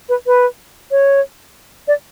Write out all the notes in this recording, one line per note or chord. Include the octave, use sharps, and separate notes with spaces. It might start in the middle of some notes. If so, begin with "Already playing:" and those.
B4
B4
C#5
D5